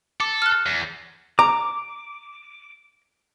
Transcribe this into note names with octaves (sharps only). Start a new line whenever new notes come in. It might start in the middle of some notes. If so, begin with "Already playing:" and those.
A4 D6
F6 F#6
E2
A#5 D6